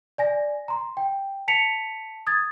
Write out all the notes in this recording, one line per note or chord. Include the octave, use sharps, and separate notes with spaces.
D5 G#5 A#6
A#5 C6
G5
A5 B6 C#7 F7
D#6 G#6 A6